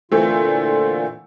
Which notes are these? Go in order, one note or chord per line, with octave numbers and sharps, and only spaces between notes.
A#2 D3 E3 A3 C4 F4